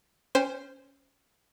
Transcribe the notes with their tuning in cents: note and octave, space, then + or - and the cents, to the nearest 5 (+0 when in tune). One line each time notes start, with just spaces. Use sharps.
C#4 +5 C5 -5 G5 +35